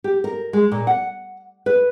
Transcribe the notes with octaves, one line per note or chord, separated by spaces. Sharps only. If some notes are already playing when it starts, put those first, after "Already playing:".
G4
A#4
G#3
A#2
F#5
B4